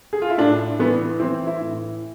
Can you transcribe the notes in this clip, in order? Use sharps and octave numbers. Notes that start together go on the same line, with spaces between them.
G#4
F4
E4
A2 D4
E3 B3
E3 C4
E4
A2